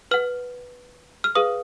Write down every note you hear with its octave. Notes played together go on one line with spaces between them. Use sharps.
B4 F#5 F6
F6
G#4 B4 F5 D#6